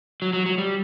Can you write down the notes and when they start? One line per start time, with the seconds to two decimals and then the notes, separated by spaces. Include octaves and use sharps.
0.22 F#3
0.33 F#3
0.46 F#3
0.58 G3